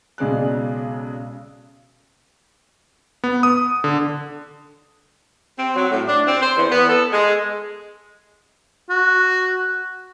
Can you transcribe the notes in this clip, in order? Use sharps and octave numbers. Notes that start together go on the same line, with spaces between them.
B1 C#3 G#3 D5 F#6
B3
D#6
D3
C4
F#3
A2
D4
C4
C5
E2
B3
A4
G#3
F#4